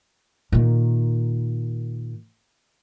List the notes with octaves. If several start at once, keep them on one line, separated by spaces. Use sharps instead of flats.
A#2 D#3